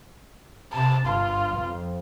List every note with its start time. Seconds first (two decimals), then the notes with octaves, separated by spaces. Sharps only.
0.73 C3 A5
1.07 G1 F4
1.59 F2